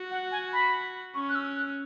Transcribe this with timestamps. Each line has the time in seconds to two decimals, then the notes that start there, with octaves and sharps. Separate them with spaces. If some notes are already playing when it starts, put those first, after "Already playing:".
Already playing: F#4
0.11 F#5
0.32 G#5
0.53 B5
1.15 C#4 C#6
1.29 F#6
1.35 E6
1.56 F#6